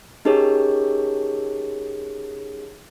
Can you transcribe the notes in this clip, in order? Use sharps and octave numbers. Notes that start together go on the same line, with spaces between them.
C#4 D#4 G4 G#4 A#4 C#5